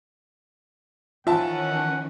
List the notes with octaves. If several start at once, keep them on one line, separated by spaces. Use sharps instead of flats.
D#3 E3 C#4 F4 E5 F#5 A5